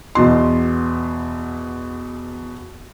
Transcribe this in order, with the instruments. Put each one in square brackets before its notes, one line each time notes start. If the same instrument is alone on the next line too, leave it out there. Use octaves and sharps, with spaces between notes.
[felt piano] E2 B2 C6